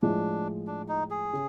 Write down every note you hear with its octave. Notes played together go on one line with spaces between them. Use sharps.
A2 F3 G#3 D4
D4
D#4
G#4
C#3